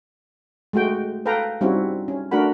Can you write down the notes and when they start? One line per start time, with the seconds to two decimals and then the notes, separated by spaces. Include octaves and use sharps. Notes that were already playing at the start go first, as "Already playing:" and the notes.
0.73 G#3 A3 F#4 G5
1.25 A4 B4 F5 G5 A#5
1.61 G3 C4 C#4 D#4 E4 F#4
2.08 C#4
2.31 A3 D4 F#4 A#4 F#5 B5